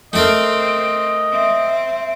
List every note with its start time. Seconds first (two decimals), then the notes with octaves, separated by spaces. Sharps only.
0.13 A3 C4 A4 A#4 D#5
1.32 C4 E5